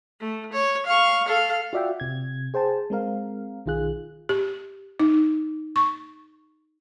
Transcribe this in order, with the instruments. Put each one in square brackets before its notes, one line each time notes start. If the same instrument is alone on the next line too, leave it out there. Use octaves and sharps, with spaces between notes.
[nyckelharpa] A3
C#5
F5 C#6
A4 F5
[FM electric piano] F4 F#4 D5 E5 F#5 G5
C3 G#6
G#4 C5 G5 A5
G#3 C4 A#4 F5
B1 D#3 F4 G#4 F#6
[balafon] G4
D#4
C#6